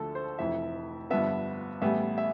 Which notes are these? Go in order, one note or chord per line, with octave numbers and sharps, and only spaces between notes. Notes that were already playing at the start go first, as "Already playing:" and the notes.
Already playing: D2 D3 F3 A3 A4
C5
F1 F2 E3 E5
G1 G2 F3 B3 E5
A1 A2 G3 B3 E5
E5